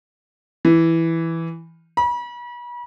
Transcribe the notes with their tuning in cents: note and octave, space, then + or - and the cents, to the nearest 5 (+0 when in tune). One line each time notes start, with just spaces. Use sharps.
E3 +0
B5 -40